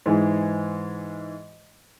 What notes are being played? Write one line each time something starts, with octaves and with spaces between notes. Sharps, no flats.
G#2 E3 G#3